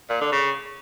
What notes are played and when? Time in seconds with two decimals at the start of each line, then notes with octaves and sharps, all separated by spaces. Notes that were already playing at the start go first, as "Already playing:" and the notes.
0.09 A#2
0.21 D3
0.32 C#3